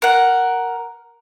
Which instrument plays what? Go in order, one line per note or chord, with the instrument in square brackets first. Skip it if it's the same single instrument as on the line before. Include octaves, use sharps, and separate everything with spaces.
[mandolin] A#4 F#5